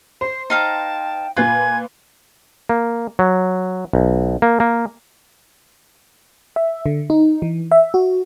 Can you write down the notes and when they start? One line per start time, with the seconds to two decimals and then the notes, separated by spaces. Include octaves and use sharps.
0.21 C5 C7
0.50 D#4 F5 G5 A5 A#5
1.37 A#2 F4 B4 G#5 F#6 G#6
2.69 A#3
3.19 F#3
3.93 B1
4.42 A#3
4.60 A#3
6.56 E5
6.86 D3
7.10 D#4
7.42 E3
7.72 E5
7.94 F#4